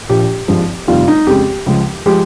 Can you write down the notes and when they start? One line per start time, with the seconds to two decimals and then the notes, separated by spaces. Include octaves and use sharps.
0.09 A#1 A#2 F3 G4
0.48 G#1 G2 F3 G#3
0.88 F1 F2 D#3 G3 F4
1.08 D#4
1.27 F2 C#3 G#3 G4
1.66 C#2 C#3 F3 G#3
2.06 F3 G#3 G4